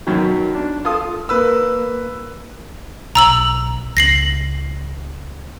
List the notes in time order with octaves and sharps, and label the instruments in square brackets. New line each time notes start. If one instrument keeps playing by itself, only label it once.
[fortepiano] F#2 B2 D#3 F#3
D4
F4 A4 D#6
[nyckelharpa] A#3 [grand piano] B4 E6
[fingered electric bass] B1 [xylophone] A#5 E6 F#7
[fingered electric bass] C#2 [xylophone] A#6 C7 F#7